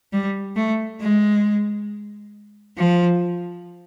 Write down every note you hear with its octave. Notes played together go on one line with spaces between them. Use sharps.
G3
A3
G#3
F3